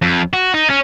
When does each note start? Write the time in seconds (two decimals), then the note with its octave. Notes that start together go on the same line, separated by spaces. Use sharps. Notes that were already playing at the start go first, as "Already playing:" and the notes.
0.02 F2
0.33 F#4
0.54 D#4
0.70 C#4